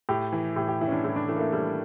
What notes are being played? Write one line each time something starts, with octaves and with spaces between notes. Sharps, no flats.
A2 G4
E3
A2 G4
G4
E3 E4
C#4
D4
A2 E4
D4
E3 A3
A#3
A3
A2 G3